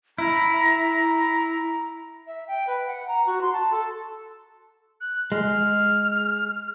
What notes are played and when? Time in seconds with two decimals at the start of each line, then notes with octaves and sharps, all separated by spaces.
0.18 E4 A#5
2.27 E5
2.48 G5
2.67 B4
2.87 F#5
3.08 A#5
3.26 F#4
3.41 C6
3.53 A5
3.71 A4
5.01 F#6
5.32 G#3 F6